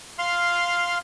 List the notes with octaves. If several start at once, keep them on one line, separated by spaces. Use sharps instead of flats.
F5 C6 F6